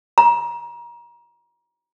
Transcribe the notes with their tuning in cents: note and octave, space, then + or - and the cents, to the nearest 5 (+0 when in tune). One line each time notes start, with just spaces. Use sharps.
A#5 +30